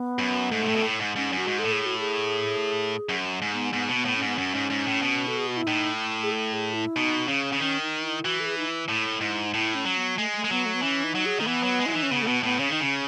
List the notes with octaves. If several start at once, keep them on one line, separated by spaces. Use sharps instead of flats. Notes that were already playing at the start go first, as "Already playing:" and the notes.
Already playing: B3
F#2
G#2 A3
B2
A2
B2
A2
G#2
G#2 C#4
F#2 F#4
G#2
A4
A2
G#4
F#4
G#4
F#2
G#2
B3
G#2 B3
B2
B3
A2
C#4
G#2
B3
F#2 C#4
G#2
G#2
A2
B2
A4
G#4
F#4
E4
A2 D#4
G#4
A4
G#4
E4
B2 D#4
C#3 C#4
C#3
D#3 C#4
D#4
E4
E3 F#4
A4
G#4
D#4
E4
A2
G#2
D#4
A2 E4
C#4
F#3
B3
G#3 A3
A3
G#3
F#3 B3
A3
B3
E3 C#4
D#4
F#3
G#4
D#3 A3
E3 B3
F#3
G#3
F#3 E4
E3 D#4
C#4
C#3 B3
A3
B2 B3
A2 B3
C#3 C#4
D#3 D#4
C#3 C#4